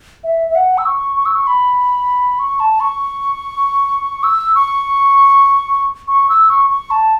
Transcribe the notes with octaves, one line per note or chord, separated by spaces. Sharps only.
E5
E5
F#5
E6
C#6
C#6
E6
C#6
B5
C#6
A5
C#6
E6
C#6
C#6
E6
C#6
C#6
A5